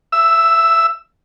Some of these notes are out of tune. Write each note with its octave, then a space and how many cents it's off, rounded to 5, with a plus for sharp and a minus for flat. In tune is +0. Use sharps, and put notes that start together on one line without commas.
E5 +20 E6 +0